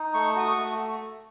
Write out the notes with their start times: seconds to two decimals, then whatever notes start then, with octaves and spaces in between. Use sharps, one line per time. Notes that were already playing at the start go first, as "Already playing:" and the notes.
Already playing: D#4
0.14 A3 C#6
0.36 F#4 D#6
0.52 C#6
0.58 A3